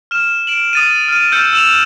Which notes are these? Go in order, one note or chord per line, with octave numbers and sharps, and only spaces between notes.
F6 E7
D7 E7 F#7
D#6 A6 D#7
F6 D#7
E6 F6 G6 A6 C#7 E7
E6 E7 F7